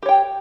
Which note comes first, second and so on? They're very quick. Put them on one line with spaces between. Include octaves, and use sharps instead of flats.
G4 C#5 G5